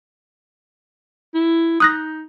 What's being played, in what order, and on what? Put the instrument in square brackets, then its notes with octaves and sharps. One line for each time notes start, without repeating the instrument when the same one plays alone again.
[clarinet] E4
[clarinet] D#4 [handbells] D#6 F#6 A#6